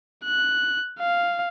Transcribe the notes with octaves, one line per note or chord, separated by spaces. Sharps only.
F#6
F5